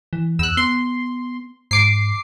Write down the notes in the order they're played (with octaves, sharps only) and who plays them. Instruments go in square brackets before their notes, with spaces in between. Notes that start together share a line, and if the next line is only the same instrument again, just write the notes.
[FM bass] E3
[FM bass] E2 [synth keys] E6 F#6
[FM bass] B3 [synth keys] C6
[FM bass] G#2 [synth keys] D6 C7